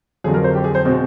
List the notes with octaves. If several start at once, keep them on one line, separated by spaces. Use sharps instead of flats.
F2 D3 F#3 G#4
A#4
C5
G4
G#4
C5
B2 G#3 C4